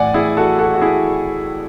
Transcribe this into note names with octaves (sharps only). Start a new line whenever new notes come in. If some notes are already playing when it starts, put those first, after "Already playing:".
Already playing: A1 A2 E3 D5 F#5 G#5
E4 G#4
F#4 A4
F#4 A4
F#4
E4 G#4